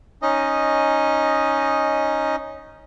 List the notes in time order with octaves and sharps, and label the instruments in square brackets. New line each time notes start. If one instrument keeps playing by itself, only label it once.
[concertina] C#4 D#4 D#5